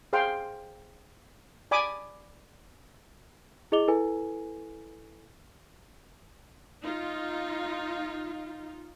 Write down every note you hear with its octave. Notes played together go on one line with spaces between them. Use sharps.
G#4 C5 F5 G5 C6
D5 G#5 B5 D6 D#6
E4 G#4 D#5 D6 F7 G7
E4 A4 B4 G#5
D#4 F4